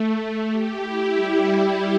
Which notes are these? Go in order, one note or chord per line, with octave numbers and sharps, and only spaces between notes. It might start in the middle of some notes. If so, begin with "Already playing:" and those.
Already playing: A3
G4
E4
G3